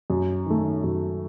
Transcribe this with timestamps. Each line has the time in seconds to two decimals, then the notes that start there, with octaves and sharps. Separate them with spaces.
0.10 F#2
0.46 D#3 A3
0.84 F#2